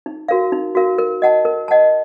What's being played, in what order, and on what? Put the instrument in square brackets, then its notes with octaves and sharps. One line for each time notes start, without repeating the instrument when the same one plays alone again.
[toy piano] D#4
F#4 A#4 F5
D#4
F#4 A#4 F5
A#4
D#5 F#5 A5
A#4
D#5 F#5 A5